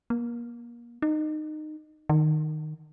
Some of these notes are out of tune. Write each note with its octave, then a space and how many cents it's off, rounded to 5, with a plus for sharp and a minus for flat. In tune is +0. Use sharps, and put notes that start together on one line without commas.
A#3 +30
D#4 -20
D#3 -15